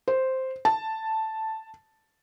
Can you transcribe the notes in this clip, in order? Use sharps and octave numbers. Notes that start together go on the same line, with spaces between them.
C5
A5